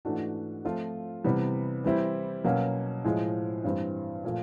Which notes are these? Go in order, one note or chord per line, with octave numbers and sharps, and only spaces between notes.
G#2 E3 A3 D4 F#4
F3 A3 C4 F4
C3 E3 G3 B3
E3 G3 C4 E4 G4
B2 F#3 A#3 C#4
A2 F3 G#3
G2 E3 G3 C4
A#2 F3 A3